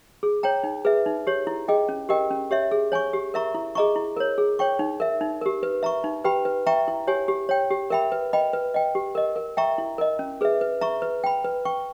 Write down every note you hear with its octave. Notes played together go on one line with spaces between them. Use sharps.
G#4
C#5 G5 A#5
D#4
G#4 B4 E5
D#4
G4 C#5
E4
G#4 D#5 G5
C#4
G4 A#4 D#5 G5
C#4
G4 C#5 E5
G#4
C#5 G#5 C#6
G4
A#4 E5 A#5 C#6
E4
G#4 D#5 A#5 C#6
E4
A#4 C#5
G#4
C#5 G5 C#6
D#4
A#4 E5
D#4
G4 A#4
B4
E5 A#5 C#6
D#4
G4 B4 G5 B5
B4
E5 G5 A#5 C#6
E4
G4 C#5 G#5
G4
C#5 G5
G4
A#4 E5 G5 B5
B4
D#5 G5 B5
B4
D#5 G5
G4
A#4 D#5
A#4
E5 G5 A#5 C#6
E4
A#4 D#5
C#4
G#4 B4 E5
B4
E5 A#5 C#6
B4
G5 B5
B4
G5 C#6